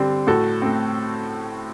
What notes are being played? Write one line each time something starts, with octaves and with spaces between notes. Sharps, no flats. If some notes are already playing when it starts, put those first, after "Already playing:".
Already playing: D3 G3 C4
A2 F#4 A4
A3 C4